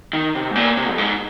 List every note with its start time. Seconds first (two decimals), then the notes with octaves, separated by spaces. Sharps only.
0.13 D#3
0.35 C3
0.50 G#2
0.56 A#2
0.77 C3
0.90 F2
0.98 G#2